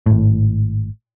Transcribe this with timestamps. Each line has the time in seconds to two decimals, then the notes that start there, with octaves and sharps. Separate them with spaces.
0.06 G#1 A2